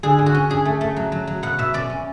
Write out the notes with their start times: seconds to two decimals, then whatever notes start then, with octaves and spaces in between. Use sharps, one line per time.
0.03 D3 G#4
0.19 D3
0.26 F#4
0.34 C#4
0.49 D4 G#4
0.65 A3
0.81 A3
0.96 F#3
1.12 F#3
1.27 F#3
1.43 B2 F#5
1.58 B2 E5
1.74 C#4 D5
1.90 C#4